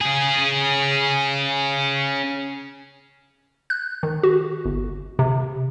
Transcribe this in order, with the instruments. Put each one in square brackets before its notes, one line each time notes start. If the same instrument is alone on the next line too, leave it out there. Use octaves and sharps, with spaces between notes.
[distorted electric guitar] C#4 G#4
[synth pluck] F#6
D#3
F#4
G1
C3